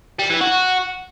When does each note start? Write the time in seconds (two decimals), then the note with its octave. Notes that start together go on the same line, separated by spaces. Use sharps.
0.19 G3
0.30 E3
0.41 F#4